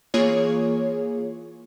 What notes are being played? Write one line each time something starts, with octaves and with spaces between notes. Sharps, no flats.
E3 A#3 F4 G#4 C#5